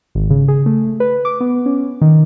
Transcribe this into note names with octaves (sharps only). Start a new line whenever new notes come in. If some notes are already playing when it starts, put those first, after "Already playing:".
G#1
C#3
G#4
A3
B4
D6
B3
C#4
D#3